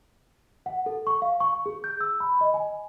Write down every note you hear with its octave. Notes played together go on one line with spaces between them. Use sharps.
F#5
A4
C#6
F5
C#6
G#4
G6
E6
B5
D#5
G#5